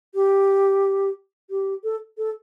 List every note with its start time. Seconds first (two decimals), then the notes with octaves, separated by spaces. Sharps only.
0.15 G4
1.50 G4
1.84 A4
2.18 A4